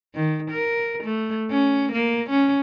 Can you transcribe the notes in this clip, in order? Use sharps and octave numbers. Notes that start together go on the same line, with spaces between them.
D#3
A#4
A3
C#4
A#3
C#4